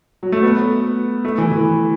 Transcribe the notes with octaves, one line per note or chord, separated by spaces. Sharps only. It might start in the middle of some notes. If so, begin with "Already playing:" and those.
F#3
A3
B3
A3
E3
E3